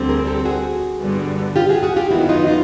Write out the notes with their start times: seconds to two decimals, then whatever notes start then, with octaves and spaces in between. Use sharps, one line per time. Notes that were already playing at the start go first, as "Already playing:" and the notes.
Already playing: D2 D3 G3 C4
0.09 G#4 A#4
0.27 G4 A4
0.45 F#4 G#4
1.01 G2 D3 G3 B3
1.56 F4 G4
1.69 F#4 G#4
1.83 F#4 G#4
1.96 F4 G4
2.11 F#2 D#3 F#3 B3 E4 F#4
2.29 D#4 F4
2.47 D#4 F4